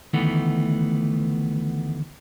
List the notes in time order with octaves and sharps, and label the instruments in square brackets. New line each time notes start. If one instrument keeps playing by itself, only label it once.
[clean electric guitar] D2 D#3 E3 A3 B3